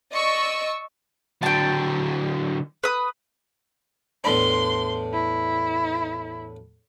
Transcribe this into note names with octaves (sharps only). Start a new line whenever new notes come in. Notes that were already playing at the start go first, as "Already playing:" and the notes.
D5 D#5 C#6 E6
D3 F#3 G5 A5
B4 D#6
E2 A2 D4 C6
E4